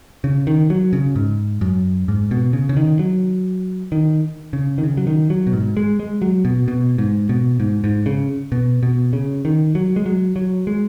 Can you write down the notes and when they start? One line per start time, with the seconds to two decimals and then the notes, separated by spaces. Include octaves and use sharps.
0.24 C#3
0.47 D#3
0.70 F#3
0.93 C#3
1.16 G#2
1.61 F#2
2.08 G#2
2.31 B2
2.53 C#3
2.69 C#3
2.77 D#3
2.99 F#3
3.92 D#3
4.53 C#3
4.78 D#3
4.83 C#3
4.97 F#3
5.07 D#3
5.30 F#3
5.47 B2
5.53 G#2
5.77 G#3
6.00 G#3
6.22 F#3
6.45 B2
6.68 B2
6.98 G#2
7.29 B2
7.60 G#2
7.84 G#2
8.06 C#3
8.52 B2
8.83 B2
9.13 C#3
9.45 D#3
9.75 F#3
9.96 G#3
10.06 F#3
10.36 F#3
10.67 G#3